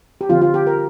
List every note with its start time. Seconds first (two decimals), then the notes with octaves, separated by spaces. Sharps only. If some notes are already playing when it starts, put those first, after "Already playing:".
0.21 G4
0.29 D3 F3 C4 F4
0.41 F4
0.54 G4
0.67 A#4